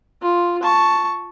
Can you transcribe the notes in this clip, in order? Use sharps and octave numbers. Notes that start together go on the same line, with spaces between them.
F4
A5 C#6